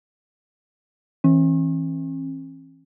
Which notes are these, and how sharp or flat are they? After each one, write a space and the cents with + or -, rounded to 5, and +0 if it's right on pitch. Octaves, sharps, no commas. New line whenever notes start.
E3 -20 C#4 -45